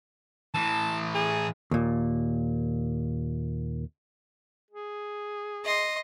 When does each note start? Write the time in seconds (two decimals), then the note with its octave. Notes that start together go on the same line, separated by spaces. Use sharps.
0.54 A2 E3 A5
1.15 G#4
1.71 D#2 A#2
4.71 G#4
5.64 D#5 C6